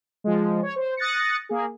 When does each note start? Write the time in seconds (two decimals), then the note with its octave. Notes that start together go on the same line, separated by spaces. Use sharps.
0.24 F3 G#3
0.63 C#5
0.76 C5
0.97 D#6 F#6 A6 A#6 C#7
1.49 A#3 G#4